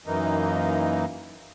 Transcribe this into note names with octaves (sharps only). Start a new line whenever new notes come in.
F#2 E3 A#3 D#4